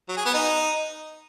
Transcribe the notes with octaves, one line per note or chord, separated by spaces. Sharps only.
F#3
G#4
B3
D#4